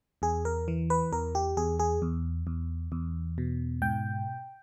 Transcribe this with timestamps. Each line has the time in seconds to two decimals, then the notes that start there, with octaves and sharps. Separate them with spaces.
0.22 E2 G#4
0.45 A#4
0.68 E3
0.90 B4
1.12 E2 A#4
1.35 G4
1.57 E2 G#4
1.80 G#4
2.02 E2
2.47 E2
2.92 E2
3.38 B2
3.82 G#2 G5